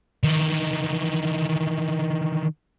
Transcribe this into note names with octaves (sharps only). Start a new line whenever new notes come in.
D#3 E3